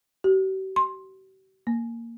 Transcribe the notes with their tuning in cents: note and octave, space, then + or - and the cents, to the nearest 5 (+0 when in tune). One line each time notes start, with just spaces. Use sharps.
G4 -45
C6 +15
A#3 -10